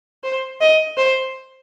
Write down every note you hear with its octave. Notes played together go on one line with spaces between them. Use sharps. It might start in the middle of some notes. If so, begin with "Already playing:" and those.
C5
D#5
C5